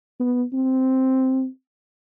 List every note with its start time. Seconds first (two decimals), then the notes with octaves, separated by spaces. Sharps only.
0.20 B3
0.53 C4